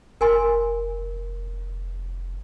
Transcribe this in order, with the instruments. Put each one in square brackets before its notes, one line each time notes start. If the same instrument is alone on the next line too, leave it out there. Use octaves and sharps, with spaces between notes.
[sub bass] F1 [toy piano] A#4 G#5 C6